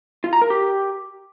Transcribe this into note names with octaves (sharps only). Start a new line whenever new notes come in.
F4
A#5
A#4
G4